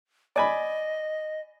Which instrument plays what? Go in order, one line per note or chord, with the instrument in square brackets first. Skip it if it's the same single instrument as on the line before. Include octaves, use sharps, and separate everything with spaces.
[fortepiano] D5 G#5 B5 [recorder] D#5